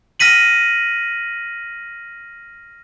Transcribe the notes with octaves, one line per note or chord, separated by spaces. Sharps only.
F6 A#6 B6 D#7 F#7